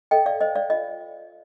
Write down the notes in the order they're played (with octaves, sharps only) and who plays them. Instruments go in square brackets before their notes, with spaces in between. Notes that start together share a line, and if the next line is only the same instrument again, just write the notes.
[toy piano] A4 D#5 G5
D5 F5
C5 D#5
D5 F5
F4 D#5